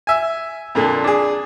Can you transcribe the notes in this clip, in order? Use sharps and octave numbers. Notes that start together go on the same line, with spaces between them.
E5 G#5
F2 A#2 D3
D4 G#4